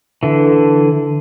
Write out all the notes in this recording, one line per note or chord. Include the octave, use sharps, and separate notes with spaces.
D3 E3